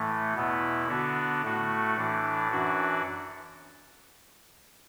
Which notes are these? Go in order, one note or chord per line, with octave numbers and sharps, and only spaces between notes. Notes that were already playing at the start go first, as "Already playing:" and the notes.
Already playing: A2 E3 A3
E2 B2 B3 E4
D3 B3 D4 F#4
A2 A3 F#4
A2 E3 D4
F#2 E3 D4 F#4